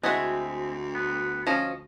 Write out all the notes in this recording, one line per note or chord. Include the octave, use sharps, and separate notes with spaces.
D2 G#3 C4 E4 F#4 G#4 E5
B3
F3 C#4 D#5